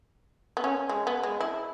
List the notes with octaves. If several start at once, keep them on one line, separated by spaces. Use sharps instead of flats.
B3
C#4
G#3
B3
G#3
E4